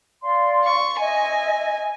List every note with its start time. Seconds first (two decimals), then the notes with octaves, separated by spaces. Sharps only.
0.23 D5 F5 C6
0.65 C#6
1.00 D#5 E5 G#5